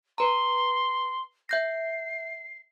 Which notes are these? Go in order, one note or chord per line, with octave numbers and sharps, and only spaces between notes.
B4 A#5 C6
E5 G6 A#6 C7